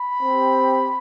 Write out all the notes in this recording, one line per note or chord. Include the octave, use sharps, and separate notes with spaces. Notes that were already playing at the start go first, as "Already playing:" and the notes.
Already playing: B5
C4 G4